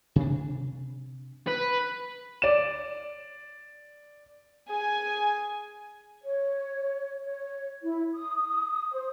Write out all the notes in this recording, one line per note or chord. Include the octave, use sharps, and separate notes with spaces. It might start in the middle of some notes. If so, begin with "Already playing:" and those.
C3 D4
B4
D5 E7
G#4 G#5
C#5
C#5
E4
D#6
C5